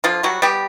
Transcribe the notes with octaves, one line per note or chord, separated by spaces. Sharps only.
D3 F3 F4
F#3 G3 F#4
G3 B3 G4